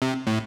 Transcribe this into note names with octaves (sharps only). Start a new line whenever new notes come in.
C3
A2